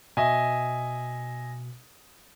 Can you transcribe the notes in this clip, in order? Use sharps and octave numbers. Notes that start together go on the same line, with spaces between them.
B2 D#5 E5 G#5